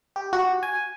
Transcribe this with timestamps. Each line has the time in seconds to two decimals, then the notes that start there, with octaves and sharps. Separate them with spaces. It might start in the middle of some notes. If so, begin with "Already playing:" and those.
0.16 G4
0.33 F#4
0.63 G#5